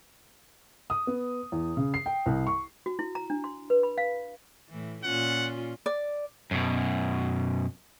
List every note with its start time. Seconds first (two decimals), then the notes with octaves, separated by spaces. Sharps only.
0.90 D#6
1.07 B3
1.52 E2
1.77 C#3
1.94 C7
2.06 G5
2.26 C2
2.47 C#6
2.86 F#4
2.99 E4
3.15 A#5
3.30 D4
3.44 C6
3.70 B4
3.83 B5
3.98 F5
4.70 A2 E3
5.04 A#2 C#4 F4 F#5
5.86 D5
6.51 F#2 B2